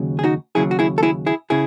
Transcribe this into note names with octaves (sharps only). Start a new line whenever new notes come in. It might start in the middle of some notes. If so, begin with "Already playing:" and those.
Already playing: D#2 C#3 F#3
G#4
D#4 F#4
D#2 C#3 F#3 E4 G#4
F#4
E4 G#4
A4
E4 G#4
E4 G#4
C#3 E4 G#4